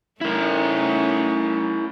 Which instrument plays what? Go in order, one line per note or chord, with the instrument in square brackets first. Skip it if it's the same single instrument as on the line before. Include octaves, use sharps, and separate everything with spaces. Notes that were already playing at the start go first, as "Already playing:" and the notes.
[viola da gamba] A3 C#4 D#4 [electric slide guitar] E4 A#4